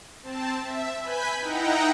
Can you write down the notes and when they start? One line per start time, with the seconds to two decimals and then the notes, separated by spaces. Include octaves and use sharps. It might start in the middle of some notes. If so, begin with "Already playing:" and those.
0.23 C4 A5
0.63 E5
1.02 B4 G#5 B5 G6 B6
1.40 D#4 E4 F#5 G5 A#5